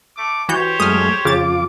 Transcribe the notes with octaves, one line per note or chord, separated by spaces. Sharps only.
A3 D6
E3 F#4 G4 C5 C#5 G6
F#2 G#3 A3 D#6 F6
F2 C#3 F4 D6 A6